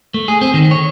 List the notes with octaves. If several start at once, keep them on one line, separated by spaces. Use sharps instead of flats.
A3
G#4
C4
D#3
C#5